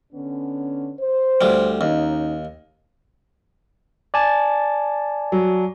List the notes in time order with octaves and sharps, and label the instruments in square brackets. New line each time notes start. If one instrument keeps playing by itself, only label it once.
[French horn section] D3 B3 C#4
C5
[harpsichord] D2 G3
[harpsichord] D#2 [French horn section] D#3 C#4 D#4
[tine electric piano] D5 G#5 A5
[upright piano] F#3